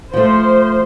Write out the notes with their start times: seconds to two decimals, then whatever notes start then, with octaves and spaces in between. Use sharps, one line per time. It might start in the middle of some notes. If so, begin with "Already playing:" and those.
0.14 F3 A3 C5